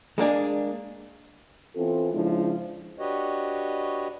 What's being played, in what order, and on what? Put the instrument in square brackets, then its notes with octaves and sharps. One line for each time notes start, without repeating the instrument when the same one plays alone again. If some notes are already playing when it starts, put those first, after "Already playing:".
[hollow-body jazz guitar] G#3 A#3 D4 G#4
[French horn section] E3 B3 C4 F4 A4
C#3 F3 G#3 D4 E4
[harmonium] D4 F#4 G4 B4 C#5 D#5